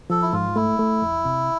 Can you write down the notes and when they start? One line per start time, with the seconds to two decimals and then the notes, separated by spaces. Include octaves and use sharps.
0.10 F3 A4
0.22 E4
0.33 G#2 F4
0.56 A3 E4
0.79 A3
1.02 F2
1.25 C3